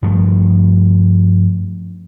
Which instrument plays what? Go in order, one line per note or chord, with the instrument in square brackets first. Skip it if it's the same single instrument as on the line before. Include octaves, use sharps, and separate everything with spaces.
[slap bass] G2 F3 A3